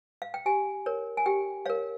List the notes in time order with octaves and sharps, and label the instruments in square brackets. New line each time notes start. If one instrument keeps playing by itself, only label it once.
[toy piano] F5
G5
G4 G#5
A#4 C#5
G#5
G4 G5
A#4 C#5 F5